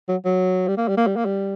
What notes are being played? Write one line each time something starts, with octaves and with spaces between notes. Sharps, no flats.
F#3
F#3
G3
A#3
G3
A#3
G3
A#3
G3